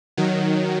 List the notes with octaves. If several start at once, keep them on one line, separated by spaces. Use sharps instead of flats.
D#3 F#3